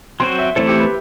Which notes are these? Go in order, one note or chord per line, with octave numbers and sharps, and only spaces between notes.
F#3 C4 F#4 C5 C6
E5
E3 A3 C4 E4 A4 C5
G4
B4